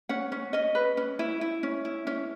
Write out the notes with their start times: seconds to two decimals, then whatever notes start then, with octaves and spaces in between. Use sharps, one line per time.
0.09 C#4 F#5
0.32 C#4
0.53 C#4 D#5
0.75 B4
0.97 C#4
1.19 E4
1.41 E4
1.63 C#4
1.85 E4
2.07 C#4